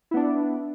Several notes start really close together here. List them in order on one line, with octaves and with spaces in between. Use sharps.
E4 B3 D4